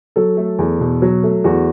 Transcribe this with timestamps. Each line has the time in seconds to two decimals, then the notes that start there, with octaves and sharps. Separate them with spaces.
0.16 F#3 A4
0.37 A3
0.59 E2
0.80 B2
1.02 F#3
1.23 A3
1.44 E2 F#4